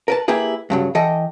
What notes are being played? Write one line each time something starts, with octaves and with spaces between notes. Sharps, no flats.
A#4 B4 A5
A#3 E4 G4 G#4 B4
G2 C#3 F#3
E3 A4 D#5 G5